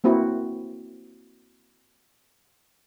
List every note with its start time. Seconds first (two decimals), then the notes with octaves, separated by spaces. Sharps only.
0.04 A#3 C4 E4 F#4 C5